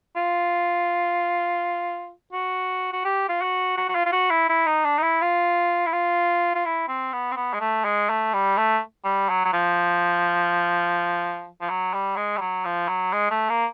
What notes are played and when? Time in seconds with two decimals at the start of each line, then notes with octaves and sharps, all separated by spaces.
0.16 F4
2.33 F#4
2.93 F#4
3.05 G4
3.29 F4
3.42 F#4
3.77 F#4
3.88 F#4
3.95 F4
4.06 F4
4.13 F#4
4.30 E4
4.49 E4
4.66 D#4
4.84 D4
4.98 D#4
5.03 E4
5.21 F4
5.86 E4
5.92 F4
6.55 F4
6.65 E4
6.88 C4
7.13 B3
7.32 C4
7.36 B3
7.54 G#3
7.60 A3
7.85 G#3
8.10 A3
8.34 G3
8.57 A3
9.05 G3
9.29 F#3
9.45 F#3
9.53 F3
11.61 F3
11.69 F#3
11.94 G3
12.17 G#3
12.37 G3
12.41 F#3
12.65 F3
12.88 F#3
13.13 G#3
13.31 A3
13.50 A#3